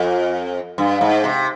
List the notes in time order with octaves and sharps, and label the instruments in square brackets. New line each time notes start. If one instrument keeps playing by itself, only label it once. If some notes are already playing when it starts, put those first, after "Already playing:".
Already playing: [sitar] F2
G2
G#2
C3